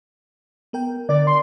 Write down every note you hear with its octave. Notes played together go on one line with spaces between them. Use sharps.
B3 A#4 G5
D3 A#4 D5 A6
C6